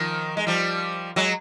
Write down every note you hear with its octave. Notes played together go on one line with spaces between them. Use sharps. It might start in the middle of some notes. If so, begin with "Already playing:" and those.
Already playing: D#3 F3
G#3
F3 G3
F#3 G#3